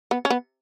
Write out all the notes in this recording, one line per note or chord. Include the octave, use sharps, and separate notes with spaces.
B3
C#4
B3